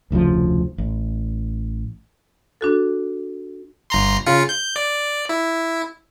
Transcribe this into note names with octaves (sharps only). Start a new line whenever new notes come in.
F1 D2 C#3 F3
A1
D4 F#4 A4
G1 A#5 C6
C#3 F4 C#7
G6
D5
E4